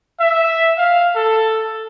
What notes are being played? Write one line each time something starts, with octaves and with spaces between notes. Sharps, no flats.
E5
F5
A4